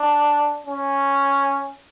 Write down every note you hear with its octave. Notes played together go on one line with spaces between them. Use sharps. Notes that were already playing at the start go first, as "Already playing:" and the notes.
Already playing: D4
C#4